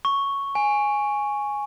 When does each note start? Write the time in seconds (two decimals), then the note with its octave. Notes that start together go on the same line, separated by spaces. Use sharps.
0.05 C#6
0.55 G#5